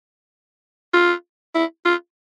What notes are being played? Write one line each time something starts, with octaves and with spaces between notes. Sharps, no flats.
F4
E4
F4